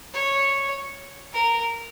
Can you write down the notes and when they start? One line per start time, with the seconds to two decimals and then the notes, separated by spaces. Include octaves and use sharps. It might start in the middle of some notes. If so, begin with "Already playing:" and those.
0.14 C#5
1.33 A#4